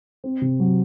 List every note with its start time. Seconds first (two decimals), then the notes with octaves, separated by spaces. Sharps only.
0.24 C4
0.41 C3
0.60 F#3